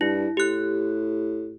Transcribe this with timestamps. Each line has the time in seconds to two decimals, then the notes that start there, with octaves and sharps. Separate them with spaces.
0.01 G2 E4
0.37 A2 G4 F#6